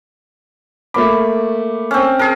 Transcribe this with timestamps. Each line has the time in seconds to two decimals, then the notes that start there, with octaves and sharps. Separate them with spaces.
0.94 A3 A#3 B5 D6
1.91 C4 C#4
2.19 G#4 A#4 A5